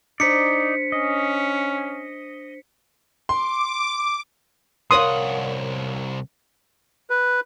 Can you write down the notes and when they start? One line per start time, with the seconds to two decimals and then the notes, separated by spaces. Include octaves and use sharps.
0.20 D4 D#4 C5 D5 B6 C#7
0.92 C#4 D#5
3.29 C6 D6
4.91 C2 A#4 C#5 F5 F#5 C6 D#6
7.10 B4